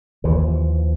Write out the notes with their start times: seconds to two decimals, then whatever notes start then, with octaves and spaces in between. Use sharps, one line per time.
0.24 D#2 E3 F3